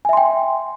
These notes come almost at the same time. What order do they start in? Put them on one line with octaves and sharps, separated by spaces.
G#5 E5 C6 G5